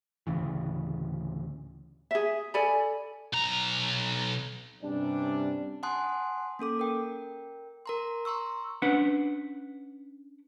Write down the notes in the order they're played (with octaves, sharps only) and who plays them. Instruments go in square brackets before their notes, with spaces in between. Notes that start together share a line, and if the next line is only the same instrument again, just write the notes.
[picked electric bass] D2 A2 C#3 E3
[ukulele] G#4 E5
A4 D5 G#5 B5
[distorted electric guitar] B1 A#5
[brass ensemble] G2 C3 G3 C#4 D4
[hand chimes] F#5 G#5 A5 C6 D#6 F#6
A#3 C#4 A4 D6
A#4 G5
A#4 A#5 C6
A#5 C6 C#6 E6
[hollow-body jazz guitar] C#4 D4 B4 F#5